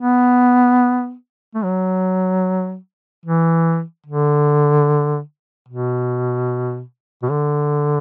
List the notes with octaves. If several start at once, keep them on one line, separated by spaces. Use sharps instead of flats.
B3
A3
F#3
E3
D3
B2
B2
D3